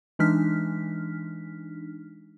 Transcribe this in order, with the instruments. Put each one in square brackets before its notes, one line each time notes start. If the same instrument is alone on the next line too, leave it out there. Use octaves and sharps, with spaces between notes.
[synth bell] E3 G#3 D4 D#4 F6 B6